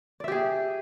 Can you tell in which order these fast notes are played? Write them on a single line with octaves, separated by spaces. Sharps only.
D5 E5 G4 G#4